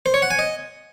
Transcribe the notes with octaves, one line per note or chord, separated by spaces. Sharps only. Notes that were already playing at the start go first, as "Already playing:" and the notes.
C5
C#5
F#5
G#5
D#5